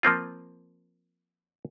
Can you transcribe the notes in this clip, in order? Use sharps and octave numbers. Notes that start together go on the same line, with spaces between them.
F3 A#3 C4 F4